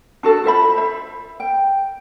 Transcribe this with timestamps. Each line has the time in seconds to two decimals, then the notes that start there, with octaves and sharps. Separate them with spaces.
0.23 D4 F#4 A4
0.44 F4 C5 E5 B5
0.76 C5 E5
1.40 G5